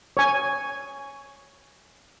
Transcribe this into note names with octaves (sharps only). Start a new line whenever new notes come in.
C#5 G#5